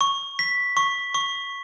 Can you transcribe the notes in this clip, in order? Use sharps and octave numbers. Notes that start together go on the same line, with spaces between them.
C#6
B6
C#6
C#6